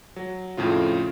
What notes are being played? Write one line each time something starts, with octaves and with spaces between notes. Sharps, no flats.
F#3
F2 A2 C#3 F4